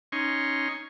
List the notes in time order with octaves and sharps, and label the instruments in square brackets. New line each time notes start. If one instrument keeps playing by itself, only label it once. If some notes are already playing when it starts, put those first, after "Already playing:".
[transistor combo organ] C#4 D#4 C6 C#6